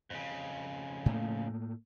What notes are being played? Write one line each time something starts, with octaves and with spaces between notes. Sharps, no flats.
F2 C#3
A2 A3 A#3